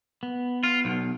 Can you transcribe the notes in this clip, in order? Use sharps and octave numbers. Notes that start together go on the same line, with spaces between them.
B3
F4
B1